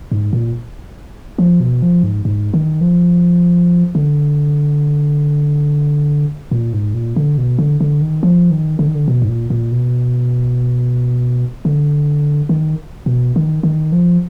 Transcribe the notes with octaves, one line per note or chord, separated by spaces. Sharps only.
G#2
A#2
F3
B2
F3
G#2
G#2
D#3
F3
D3
A#2
G#2
A#2
D3
B2
D3
D3
D#3
F3
D#3
D3
D#3
D3
B2
G#2
A#2
A#2
B2
D3
D#3
B2
D#3
D#3
F3